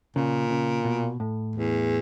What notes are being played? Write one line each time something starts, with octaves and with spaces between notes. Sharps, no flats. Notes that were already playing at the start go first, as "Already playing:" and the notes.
A#2 C#3
C#3
B2
A2
E2